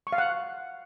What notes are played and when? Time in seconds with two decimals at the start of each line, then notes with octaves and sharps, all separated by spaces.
0.07 C#6
0.13 F5
0.18 F#5